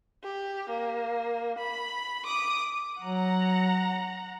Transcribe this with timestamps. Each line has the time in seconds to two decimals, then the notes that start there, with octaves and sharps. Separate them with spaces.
0.24 G4
0.69 A#3
1.58 B5
2.25 D6 D#6
3.02 F#3 F#5 A#5